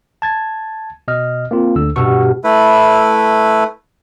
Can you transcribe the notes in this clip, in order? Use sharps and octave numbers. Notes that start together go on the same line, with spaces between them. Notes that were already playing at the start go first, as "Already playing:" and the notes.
A5 G#6 A6
B2 D#5 F6
A#3 C4 F4
D2 D3 E6
G2 B2 C#6 E6
A3 E4 B4